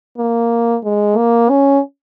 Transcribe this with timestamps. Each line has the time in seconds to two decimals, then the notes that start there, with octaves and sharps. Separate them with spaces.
0.18 A#3
0.84 G#3
1.17 A#3
1.50 C#4